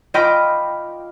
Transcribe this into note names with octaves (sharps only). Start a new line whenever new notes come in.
F4 D#5 G5 B5 D6